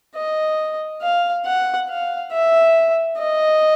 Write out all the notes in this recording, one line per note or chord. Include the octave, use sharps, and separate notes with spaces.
D#5
F5
F#5
F5
E5
D#5